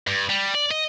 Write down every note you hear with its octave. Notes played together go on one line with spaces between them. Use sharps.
G2
G3
D5
D#5